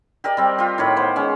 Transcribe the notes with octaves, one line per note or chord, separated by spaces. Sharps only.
G4 A#4 D5 D#5
G3 C4
F4 G4
A2 D#3 C#5 B5
B3 C5
G#3 C#4